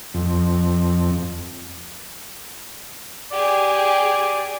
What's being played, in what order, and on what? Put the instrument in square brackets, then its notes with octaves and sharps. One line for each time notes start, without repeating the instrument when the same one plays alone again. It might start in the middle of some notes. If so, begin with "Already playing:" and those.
[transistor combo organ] F2
[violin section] G4 G#4 [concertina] D5